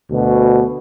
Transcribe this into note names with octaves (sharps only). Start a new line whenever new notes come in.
D2 B2